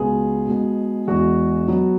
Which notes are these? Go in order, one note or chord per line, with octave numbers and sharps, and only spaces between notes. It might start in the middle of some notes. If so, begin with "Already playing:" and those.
Already playing: C#2 B2 B3 G#4
B2 G#3 B3
E2 E3 G#3 B3 F#4
B2 F#3 B3